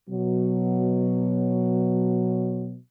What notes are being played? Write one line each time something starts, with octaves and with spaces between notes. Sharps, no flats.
B2 F#3